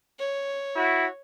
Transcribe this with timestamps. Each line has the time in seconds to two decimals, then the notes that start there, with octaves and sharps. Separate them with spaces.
0.19 C#5
0.75 E4 F#4